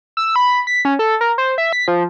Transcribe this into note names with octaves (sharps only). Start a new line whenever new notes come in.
E6
B5
B6
C#4
A4
A#4
C5
E5
B6
F3